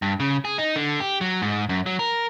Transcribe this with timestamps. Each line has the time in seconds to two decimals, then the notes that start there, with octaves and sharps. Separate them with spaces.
0.02 G2
0.20 C#3
0.45 G#4
0.58 D#4
0.76 D3
1.00 G4
1.21 F#3
1.42 G#2
1.69 F#2
1.86 F#3
1.99 A#4